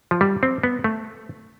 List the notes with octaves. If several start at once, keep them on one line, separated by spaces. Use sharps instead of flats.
F3
G3
C4
B3
A3